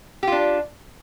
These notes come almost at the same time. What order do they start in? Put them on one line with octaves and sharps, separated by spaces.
G4 F4 D4